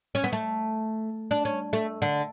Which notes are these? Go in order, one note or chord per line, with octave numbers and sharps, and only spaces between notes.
C#4
B3
A3
D4
C#4
A3
D3